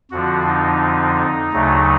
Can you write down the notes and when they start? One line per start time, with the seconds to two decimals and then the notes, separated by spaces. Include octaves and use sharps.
0.11 F2 D3 F3 F#4
0.47 D#4
1.52 D2 C#3 F#3 A3